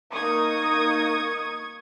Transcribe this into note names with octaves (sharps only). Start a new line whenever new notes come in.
A#3 D#4 C#6 D#6 G#6